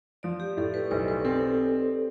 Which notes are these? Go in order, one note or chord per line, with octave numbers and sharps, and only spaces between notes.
F3 D5
G4
A2 A4
B4
B1 C5
B4
C4 A4